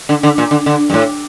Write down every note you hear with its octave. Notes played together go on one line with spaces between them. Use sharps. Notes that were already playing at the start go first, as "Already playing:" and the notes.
D3
D3
A#2
D3
D3
G2
A2